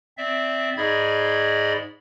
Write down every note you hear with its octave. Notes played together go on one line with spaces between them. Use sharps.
C4 D5 E5
G#2 G#4 D5 D#5 B5 G#6